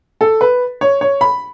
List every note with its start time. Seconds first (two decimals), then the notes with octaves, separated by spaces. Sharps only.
0.21 A4
0.41 B4
0.81 C#5
1.01 C#5
1.21 B5